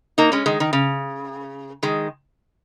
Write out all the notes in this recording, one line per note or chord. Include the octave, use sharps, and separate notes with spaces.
A#3 D#4
G#3 C#4
D#3 G#3
D#3
C#3
D#3 G#3